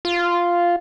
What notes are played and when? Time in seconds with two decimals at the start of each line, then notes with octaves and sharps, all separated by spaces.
0.05 F4